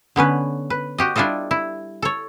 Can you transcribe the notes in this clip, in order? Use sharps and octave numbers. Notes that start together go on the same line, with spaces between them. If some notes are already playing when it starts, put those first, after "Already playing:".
D3 B3 C#4 B4
B4
F#4 G4 D#5
G3 D4 E4 F4 A4 D#5
E4
A4 C#5